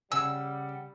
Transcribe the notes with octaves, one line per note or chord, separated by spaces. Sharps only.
C#3 G3 F#5 G#5 E6